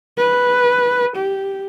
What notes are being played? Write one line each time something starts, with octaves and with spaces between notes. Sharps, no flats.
B4
G4